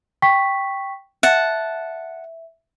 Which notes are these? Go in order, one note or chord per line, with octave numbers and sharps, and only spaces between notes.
G5 C#6 B6
E5 F#5 A5